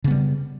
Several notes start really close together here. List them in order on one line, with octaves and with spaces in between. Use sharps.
C#3 B3 G3